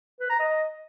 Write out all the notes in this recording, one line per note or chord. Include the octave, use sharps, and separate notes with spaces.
B4
A#5
D#5